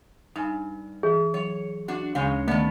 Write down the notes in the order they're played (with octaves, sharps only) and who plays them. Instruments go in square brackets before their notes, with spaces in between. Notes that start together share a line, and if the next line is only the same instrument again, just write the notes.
[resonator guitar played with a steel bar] G2 [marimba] D#4 G#5
[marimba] E3 [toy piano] G#4
[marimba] F#3 [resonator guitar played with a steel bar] C#5
[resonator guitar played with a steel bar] D4 F#4
[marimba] D2 C#4 [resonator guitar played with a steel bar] C#3 G#3 C#5
[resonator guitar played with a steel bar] D#3 B3 [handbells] A3 [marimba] D5 A5